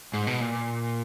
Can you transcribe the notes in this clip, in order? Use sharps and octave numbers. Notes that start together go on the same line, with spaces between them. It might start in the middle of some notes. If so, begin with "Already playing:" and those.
G#2
B2
A#2